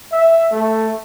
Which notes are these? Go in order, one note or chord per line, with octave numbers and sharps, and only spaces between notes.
E5
A3